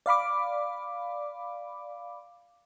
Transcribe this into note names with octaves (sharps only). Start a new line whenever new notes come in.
D5 F5 B5 D6